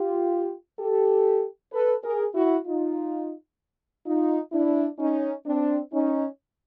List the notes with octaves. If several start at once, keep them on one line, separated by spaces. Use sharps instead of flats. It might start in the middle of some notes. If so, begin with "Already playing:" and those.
Already playing: F4 G4
G4 A4
A4 B4
G#4 A#4
E4 F#4
D#4 F4
D#4 F4
D4 E4
C#4 D#4
C4 D4
C#4 D#4